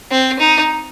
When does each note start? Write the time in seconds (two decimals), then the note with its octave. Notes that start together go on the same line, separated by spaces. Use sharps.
0.11 C4
0.40 D#4